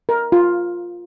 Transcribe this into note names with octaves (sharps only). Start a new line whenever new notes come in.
A#4
F4